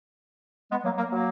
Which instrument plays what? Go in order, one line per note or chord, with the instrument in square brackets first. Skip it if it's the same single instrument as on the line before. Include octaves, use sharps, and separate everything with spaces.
[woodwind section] G#3 B3
F#3 A#3
F#3 A#3
F#3 A#3